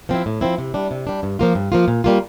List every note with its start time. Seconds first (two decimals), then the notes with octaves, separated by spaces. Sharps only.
0.09 F3 C4 E4
0.26 A2
0.41 F3 C4 E4
0.58 C3
0.74 G3 D4
0.91 C3
1.07 G3 D4
1.23 G2
1.39 F3 A#3 F4
1.55 G2
1.72 F3 A#3 F4
1.88 A#2
2.04 G3 A#3 F4